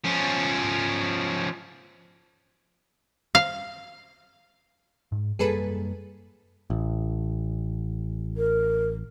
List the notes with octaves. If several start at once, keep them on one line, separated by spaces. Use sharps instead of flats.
F3 C#4
F5
G#2
F#2 G3 A#3 G#4 A4 B4
A1
A#4